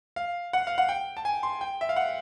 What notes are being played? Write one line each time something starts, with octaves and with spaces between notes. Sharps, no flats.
F5
F#5
F5
F#5
G5
A5
G#5
C6
G5
E5
F5
F#5